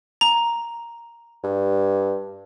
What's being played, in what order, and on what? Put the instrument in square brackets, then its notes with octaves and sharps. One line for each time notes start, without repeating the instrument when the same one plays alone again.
[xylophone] A#5
[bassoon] G2